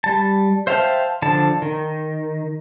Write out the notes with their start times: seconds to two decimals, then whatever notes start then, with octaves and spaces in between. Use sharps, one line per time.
0.04 G3 A5
0.67 C5 E5 F5 G5 A5
1.22 D3 F3 A5
1.62 D#3